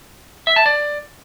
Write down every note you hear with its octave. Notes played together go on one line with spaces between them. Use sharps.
E5
A5
D5